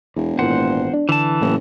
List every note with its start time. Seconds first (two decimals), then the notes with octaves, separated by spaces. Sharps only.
0.16 E1 E2
0.39 G#1 A#2 E3 C5 F#5
0.93 D4
1.09 D3 E3 A5
1.41 F#1 A2